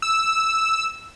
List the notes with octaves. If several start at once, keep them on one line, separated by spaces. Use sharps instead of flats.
E6